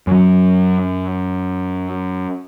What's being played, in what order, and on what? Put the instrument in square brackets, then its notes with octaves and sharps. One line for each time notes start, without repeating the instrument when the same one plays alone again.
[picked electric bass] F#2 F#3